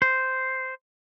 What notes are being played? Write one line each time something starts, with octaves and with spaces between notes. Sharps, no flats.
C5